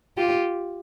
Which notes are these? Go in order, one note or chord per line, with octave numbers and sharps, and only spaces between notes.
F4 G4